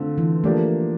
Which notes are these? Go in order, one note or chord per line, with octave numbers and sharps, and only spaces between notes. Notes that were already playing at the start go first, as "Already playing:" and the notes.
Already playing: D3 A3 C4 F4
E3
F3 A3 A#3 D4 G4